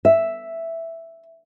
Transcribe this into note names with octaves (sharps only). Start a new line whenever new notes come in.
E5